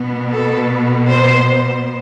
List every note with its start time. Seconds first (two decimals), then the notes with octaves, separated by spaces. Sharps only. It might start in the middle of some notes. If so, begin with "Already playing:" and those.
Already playing: B2 B3
0.32 A4
1.09 C5